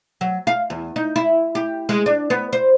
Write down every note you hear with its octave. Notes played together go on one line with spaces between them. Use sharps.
F#3
F5
E2
D#4
E4
G4
G#3
D4
B3
C5